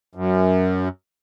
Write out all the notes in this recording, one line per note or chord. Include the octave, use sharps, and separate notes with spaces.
F#2